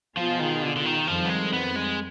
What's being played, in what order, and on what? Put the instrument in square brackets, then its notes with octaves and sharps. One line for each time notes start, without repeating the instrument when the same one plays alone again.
[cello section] B2 B3 F4 G#4 [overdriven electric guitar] F3
[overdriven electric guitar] D#3
D3
D3
D#3
[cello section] F2 D#3 G3 C4 [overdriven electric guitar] F3
[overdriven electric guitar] B3
G#3
B3
G#3